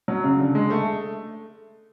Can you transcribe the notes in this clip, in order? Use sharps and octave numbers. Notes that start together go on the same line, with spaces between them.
F#3
C#3
D3
G#3
A3